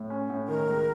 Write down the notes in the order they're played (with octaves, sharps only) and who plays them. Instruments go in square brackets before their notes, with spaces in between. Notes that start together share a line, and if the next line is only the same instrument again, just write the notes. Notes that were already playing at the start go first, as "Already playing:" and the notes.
Already playing: [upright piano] A2
C#4
A2
[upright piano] D#3 [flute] A#4
[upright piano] C#2